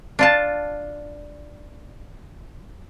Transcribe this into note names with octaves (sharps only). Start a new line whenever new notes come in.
D4 F4 A5